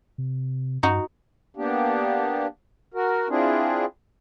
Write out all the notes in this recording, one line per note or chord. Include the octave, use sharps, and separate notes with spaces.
C3
G2 D#4 F#4
A#3 B3 D4 G4
F#4 A#4
C4 D4 E4 F4 G#4